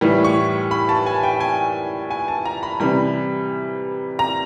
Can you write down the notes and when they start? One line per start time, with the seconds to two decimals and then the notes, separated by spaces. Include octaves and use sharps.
0.01 A2 E3 G3
0.24 C#6
0.71 B5
0.89 A5
1.06 G#5
1.23 G5
1.41 G#5
2.11 G#5
2.28 A5
2.46 A#5
2.63 B5
2.80 C3 E3 G3 B5
4.19 A#5